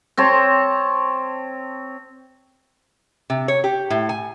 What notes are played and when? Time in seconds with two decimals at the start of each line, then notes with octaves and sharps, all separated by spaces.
0.17 C4 C#5 A5
3.30 C3
3.48 C#5
3.64 G4
3.90 A2
4.09 G#5